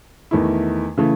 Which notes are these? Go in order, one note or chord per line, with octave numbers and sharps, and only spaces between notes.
E2 D#3 A3 E4
C#3 E3 A3